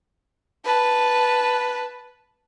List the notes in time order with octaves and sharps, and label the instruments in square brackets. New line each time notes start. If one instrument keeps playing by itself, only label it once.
[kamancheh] B4 A5